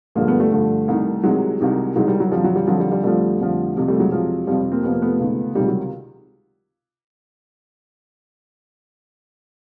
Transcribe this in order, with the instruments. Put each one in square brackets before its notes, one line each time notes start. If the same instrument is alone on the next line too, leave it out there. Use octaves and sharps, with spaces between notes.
[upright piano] G2 D3 F3 G#3 A#3
A3 B3
G3 A3
G2 D3 F3
C2 C3 D#3
C2 C3 D#3 F#3 G#3
C2 C3 D#3
C2 C3 D#3 F#3 G#3
G3
F#3
F2 D3 F3 G3
F#3
G3
F2 D3 F3 F#3
G3
G3
F2 D3 F3 G3 A3
F2 D3 F3
F2 C3 F3
G3 A3
F#3 G#3
F2 C3 F3
F2 C3 F3 G3
A#3 C4
F2 C3 F3 B3
A#3
A3 B3
C#2 C3 D#3
C#2 C3 D#3 G3
F#3